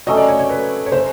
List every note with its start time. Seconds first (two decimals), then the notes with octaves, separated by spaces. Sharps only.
0.07 F#3 A3 C#4 D#5
0.17 D5
0.28 C#5
0.39 C#5
0.49 B4
0.86 C#5
0.92 C5